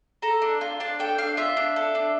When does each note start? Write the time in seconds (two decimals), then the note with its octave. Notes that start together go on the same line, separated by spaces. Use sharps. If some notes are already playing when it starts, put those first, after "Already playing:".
0.22 A4 A#5
0.42 D4
0.61 F4
0.80 D4 A5
0.99 A4 G5
1.18 D4 F5
1.37 F4 E5
1.57 D4
1.76 A4
1.95 D4